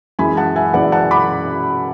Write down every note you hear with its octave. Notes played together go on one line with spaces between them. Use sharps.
F#2 E3 G#3 G#5 B5
F#5 A5
E5 G#5
F#2 E3 G#3 D5 F#5
F#5 A5
B5 D6